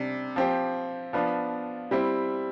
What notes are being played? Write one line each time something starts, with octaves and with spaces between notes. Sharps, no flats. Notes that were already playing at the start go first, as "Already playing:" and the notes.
Already playing: C3 G3 D4
F3 C4 G4
F3 B3 D4 F4
G3 C4 E4